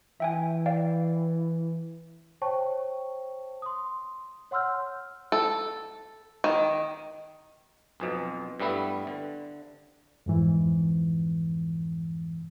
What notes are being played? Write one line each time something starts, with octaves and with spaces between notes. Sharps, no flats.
E3 E5 G5 G#5
D5 F5 G5
C5 C#5 G5 A5 C#6
C6 D#6
C#5 F#5 C6 E6 F6 G6
A4
D#3
B1 F2 B2
G2 G3 A3 B3 E4
D3
F2 G#2 E3